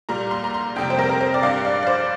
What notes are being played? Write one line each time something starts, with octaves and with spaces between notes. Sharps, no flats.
A#2 G3 A#5
C6
A#5
C6
F2 C3 G3 G5
C5
A#4
A#4
C5
D5
G2 G3 F5
D5
D5
C5